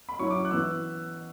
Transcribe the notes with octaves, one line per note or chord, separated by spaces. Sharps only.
B5
F#3 C#4 E4 C#6
D6
F#6
E3 B3 E4 E6